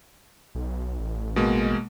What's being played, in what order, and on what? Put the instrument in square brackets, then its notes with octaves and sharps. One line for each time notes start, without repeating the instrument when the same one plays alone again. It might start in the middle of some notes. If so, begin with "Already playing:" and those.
[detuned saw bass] B1
A1
[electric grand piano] B2 G#3 A#3